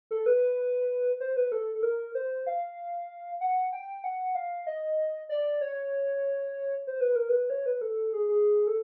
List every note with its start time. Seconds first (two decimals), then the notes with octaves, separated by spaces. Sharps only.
0.11 A4
0.26 B4
1.20 C5
1.36 B4
1.52 A4
1.75 A4
1.83 A#4
2.15 C5
2.47 F5
3.41 F#5
3.72 G5
4.04 F#5
4.35 F5
4.67 D#5
5.29 D5
5.61 C#5
6.87 C5
7.01 B4
7.16 A#4
7.29 B4
7.50 C#5
7.66 B4
7.81 A4
8.13 G#4
8.29 G#4
8.67 A4